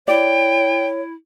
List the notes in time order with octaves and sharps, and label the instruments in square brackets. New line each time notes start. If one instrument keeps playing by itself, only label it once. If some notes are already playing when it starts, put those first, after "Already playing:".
[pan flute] E4 [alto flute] C#5 [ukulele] D5 [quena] G5